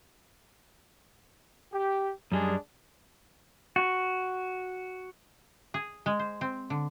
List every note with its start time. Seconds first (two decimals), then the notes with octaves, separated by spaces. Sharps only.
1.72 G4
2.32 F#2 G3 G#3 D4 G#4
3.76 F#4
5.74 G#4
6.06 G#3
6.19 C5
6.41 C4
6.70 D3